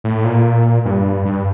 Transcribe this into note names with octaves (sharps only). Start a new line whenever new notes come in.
A2
A#2
G2
G2